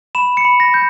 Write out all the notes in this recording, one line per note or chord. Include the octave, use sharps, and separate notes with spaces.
B5 E7
C#7
B5
A#6
G6